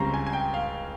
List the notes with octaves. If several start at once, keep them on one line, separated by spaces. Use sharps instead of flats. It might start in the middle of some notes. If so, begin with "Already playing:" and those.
Already playing: C#2 C#3 G3 C4 A#5 C6 C#6
G#5
G#5
G5
F5